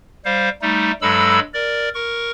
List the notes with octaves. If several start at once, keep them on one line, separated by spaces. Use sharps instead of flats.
G3 C5 F5
G3 A3 D#4
G2 F#3 G#3 A4 B5 E6
A#4 D5
A#4 C#6